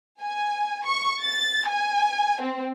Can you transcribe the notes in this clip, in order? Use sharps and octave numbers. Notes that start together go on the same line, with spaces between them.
G#5
C#6
A6
G#5
C4